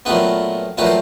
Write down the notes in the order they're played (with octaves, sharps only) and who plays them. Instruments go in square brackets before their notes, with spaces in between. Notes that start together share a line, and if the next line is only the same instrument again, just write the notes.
[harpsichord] A#2 F#3 A3 B3 C4 F4 B4
A#2 F#3 A3 C4 F4 B4
C5